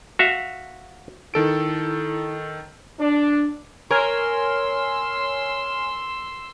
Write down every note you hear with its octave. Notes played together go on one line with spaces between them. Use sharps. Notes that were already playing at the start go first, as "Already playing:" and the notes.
F#4 E5 F5
D#3 E4 A4 D7
D4
A#4 C#5 G#5 C6 E6 F6